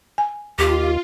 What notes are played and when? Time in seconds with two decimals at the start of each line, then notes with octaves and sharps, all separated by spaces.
0.18 G#5
0.59 D#2 F4 G4